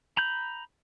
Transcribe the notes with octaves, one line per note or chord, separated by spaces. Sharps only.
A#5 B5 G6